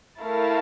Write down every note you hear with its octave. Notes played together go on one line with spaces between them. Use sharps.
A3 E4 A#4 F5 A5